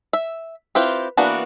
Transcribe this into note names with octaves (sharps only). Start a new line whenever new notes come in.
E5
C4 E4 F4 G4 B4
E3 A#3 B3 D4 F#4